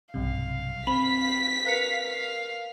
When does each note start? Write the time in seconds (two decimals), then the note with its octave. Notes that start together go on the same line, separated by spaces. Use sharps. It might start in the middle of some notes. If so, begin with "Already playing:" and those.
0.14 B1 G2 C3 F5
0.87 C4 B5 B6
1.67 A#4 B4 F5 C#7
2.06 F5